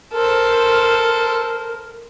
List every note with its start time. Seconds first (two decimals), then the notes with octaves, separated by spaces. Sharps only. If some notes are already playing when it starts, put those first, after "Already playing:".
0.13 A4 A#4 C5